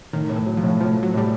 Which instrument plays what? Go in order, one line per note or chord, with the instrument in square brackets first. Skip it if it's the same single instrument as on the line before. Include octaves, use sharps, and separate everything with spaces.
[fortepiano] A2 [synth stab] D#3
[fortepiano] A2
[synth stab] E3
[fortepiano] F#3
[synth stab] F3
[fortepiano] A2
[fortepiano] A2 [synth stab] F3
[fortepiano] A2
[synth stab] F#3
[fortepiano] A2 [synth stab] G3